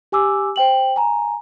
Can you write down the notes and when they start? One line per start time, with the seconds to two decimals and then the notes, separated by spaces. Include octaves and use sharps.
0.12 G4 G#5 D6 E6
0.56 C5 G5 F#7
0.96 G#5 A#5